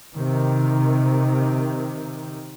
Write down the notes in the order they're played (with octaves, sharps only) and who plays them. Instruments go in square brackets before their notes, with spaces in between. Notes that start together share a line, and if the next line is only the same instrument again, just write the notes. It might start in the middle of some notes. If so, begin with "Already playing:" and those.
[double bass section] C3 D#3